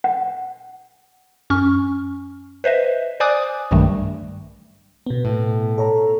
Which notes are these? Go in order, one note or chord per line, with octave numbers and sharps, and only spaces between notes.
F#5
F#2 C#4 C#6 F6
B4 C5 D#5 E5
C5 D5 G#5 D6 D#6 F#6
B1 G2 D#3 G3 A3
B2 B3
A2
A4 C#5 A#5